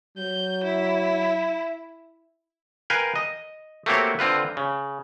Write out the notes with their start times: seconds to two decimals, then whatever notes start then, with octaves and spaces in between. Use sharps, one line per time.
0.17 F#3 G6
0.63 E4
2.90 A#4 B4 F5 G5 G#5
3.16 D#5
3.86 A3 A#3 C4 F#4 G4 C#5
4.19 D3 C4 F4 B4
4.57 C#3